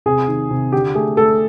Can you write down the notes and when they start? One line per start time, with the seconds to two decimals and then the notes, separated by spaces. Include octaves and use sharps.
0.06 C3 G#4
0.28 D#3
0.50 C3
0.72 D3 G4
0.95 A3 G#4
1.17 A3 A4